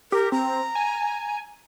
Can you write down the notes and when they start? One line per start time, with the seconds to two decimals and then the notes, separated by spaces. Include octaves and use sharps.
0.12 G4 A#4
0.32 C4 A#5
0.75 G#5